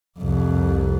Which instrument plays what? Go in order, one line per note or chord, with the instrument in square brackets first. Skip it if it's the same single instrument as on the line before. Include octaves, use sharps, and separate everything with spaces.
[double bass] C2 F2